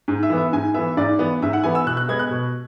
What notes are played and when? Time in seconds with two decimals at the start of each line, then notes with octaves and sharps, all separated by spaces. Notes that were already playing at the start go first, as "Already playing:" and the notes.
0.08 G#2
0.23 E5
0.30 E3 B3
0.38 E5
0.53 G#2 G#5
0.74 E3 B3 E5
0.97 G#2 D5
1.19 E3 B3
1.42 G#2 E5
1.53 F#5
1.64 E3 B3 G#5
1.75 E6
1.86 B2 F#6
1.97 F#6
2.08 G#3 B3 G#6
2.19 F#6
2.31 B2